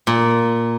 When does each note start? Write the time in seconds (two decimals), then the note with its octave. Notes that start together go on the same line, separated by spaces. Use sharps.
0.07 A#2